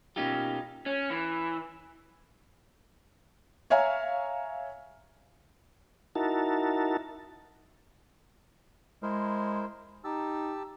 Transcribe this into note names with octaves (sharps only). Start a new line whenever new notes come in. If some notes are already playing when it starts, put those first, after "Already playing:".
B2 A#3 C#4 D#4 F4 G4
C#4
E3
C#5 E5 F5 G#5 A#5
D#4 E4 F#4 A#4 A5
G#3 E4 A#4 C5
D#4 G4 A5 E6